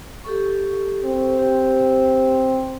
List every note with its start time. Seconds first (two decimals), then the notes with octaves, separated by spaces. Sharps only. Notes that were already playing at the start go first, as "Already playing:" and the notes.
0.24 G4 A4 C#6
1.04 C4
1.39 G4